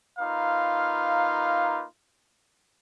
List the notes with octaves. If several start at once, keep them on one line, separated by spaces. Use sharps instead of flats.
A#3 D#4 F4 B4 F5